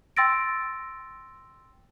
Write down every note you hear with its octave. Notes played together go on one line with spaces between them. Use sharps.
G5 C6 E6 A6 A#6 D7